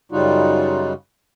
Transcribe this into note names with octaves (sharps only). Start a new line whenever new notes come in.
F#2 C#3 G3 D#4 F4 F#4